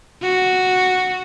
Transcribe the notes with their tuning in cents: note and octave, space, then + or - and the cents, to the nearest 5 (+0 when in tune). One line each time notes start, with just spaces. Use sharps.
F#4 -5